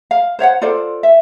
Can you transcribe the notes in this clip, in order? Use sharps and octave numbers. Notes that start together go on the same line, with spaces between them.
F5
C5 C#5 F5 F#5
F4 A4 C5 D5
E5